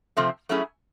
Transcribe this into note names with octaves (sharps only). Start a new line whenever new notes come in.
C3 F3 A3 C4
F#3 A3 C#4 E4 G#4